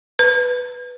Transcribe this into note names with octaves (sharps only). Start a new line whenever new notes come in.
B4